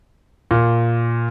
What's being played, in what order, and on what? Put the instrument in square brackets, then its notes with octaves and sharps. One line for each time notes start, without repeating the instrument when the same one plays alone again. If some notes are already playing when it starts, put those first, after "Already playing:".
[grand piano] A#2